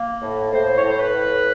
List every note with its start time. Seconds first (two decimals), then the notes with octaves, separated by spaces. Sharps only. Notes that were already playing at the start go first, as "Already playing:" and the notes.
Already playing: A#3
0.21 A2
0.52 A2 C5
0.77 C#5
0.84 A2 C5
1.00 B4
1.15 A2